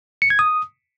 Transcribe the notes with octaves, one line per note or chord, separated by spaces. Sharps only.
C#7
G#6
D#6